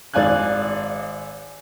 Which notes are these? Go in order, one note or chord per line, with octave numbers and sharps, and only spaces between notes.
G#1 D5 F5 G#5 F#6